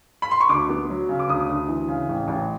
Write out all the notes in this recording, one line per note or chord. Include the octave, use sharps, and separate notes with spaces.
B5
C6
C#6
D2 D6
B3
F#3
C#3
D6
D2 D#6
D2
E3
C#3
A1
A1